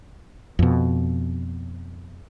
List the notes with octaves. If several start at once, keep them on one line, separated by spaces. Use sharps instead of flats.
F2 B2